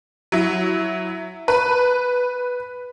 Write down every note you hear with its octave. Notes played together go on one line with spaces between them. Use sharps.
F#3 E4
B4